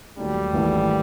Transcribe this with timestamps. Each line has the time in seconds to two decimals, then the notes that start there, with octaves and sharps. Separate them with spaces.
0.17 D#2 D#3 F#3 G3 A3
0.52 G#1 G#2 E3 A3